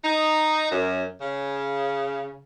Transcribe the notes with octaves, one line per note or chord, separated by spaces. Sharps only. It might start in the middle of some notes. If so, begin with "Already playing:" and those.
D#4
F#2
C#3